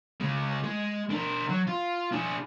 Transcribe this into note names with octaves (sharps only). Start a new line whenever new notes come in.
C#3 G#3
G#3
D4 A#4
F#3
F4
D4 G#4